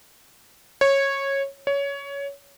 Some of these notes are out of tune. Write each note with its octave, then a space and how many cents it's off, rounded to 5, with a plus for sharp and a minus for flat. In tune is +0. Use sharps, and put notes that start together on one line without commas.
C#5 -15
C#5 +15